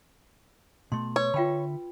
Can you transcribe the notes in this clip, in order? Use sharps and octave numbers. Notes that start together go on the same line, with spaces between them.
B2 A3 C6
B4 C#5
D3 F4 E5 G5 B5